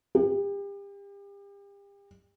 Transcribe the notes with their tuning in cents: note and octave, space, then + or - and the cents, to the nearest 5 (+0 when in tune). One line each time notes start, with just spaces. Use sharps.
G4 +35